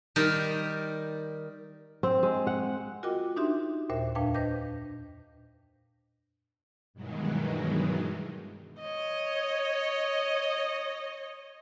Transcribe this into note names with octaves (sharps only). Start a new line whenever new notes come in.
D#3 G3 G4 A#4
C4
G#3
F#5
F4 F#4 A#4 D#5 G5 D6
D4 D#4 F#4 G4 E5 C6
D#2 A#2 A#4 C5 E5
F2 A#2 D4 B4 F5 G5
D4 B4 C5 D#5 G6 A#6
G2 B2 D#3 E3 F#3 G#3
C#5 D#5